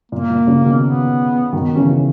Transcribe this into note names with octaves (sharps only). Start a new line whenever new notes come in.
A#2 A#3
A#2
A#2 C#3
B2 D#3
B3
B2 D#3
C#4
C#3 E3